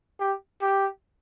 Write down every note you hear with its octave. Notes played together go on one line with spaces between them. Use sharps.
G4
G4